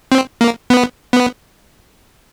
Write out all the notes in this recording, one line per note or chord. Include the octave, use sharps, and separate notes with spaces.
C4
A#3
B3
B3